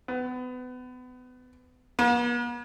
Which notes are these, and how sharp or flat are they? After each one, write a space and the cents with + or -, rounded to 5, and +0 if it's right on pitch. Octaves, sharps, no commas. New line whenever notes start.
B3 +30
B3 -45